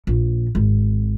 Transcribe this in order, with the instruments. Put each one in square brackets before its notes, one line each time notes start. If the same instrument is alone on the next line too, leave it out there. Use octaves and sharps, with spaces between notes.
[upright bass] A#1
G#1